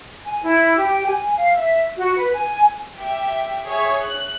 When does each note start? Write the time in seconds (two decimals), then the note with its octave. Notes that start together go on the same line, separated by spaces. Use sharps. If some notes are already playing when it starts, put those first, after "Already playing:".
0.24 G#5
0.44 E4
0.76 G4
1.06 G#5
1.36 F5
1.53 E5
1.98 F#4
2.16 B4
2.34 G#5
2.98 G4 E5
3.65 G#4 C#5 E5
4.04 F#6